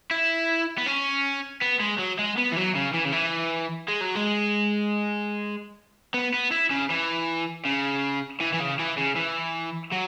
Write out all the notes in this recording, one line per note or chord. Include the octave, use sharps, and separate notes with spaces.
E4
B3
C#4
B3
G#3
F#3
G#3
B3
E3
F#3
C#3
E3
C#3
E3
G#3
F#3
G#3
B3
B3
E4
C#3
E3
C#3
E3
E3
C#3
E3
C#3
E3
F#3